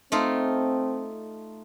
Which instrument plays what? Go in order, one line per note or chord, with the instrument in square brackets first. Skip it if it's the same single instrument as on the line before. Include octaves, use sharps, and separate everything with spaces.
[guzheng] A3 D#4 F4 [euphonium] C4